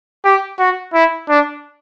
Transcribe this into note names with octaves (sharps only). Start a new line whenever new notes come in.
G4
F#4
E4
D4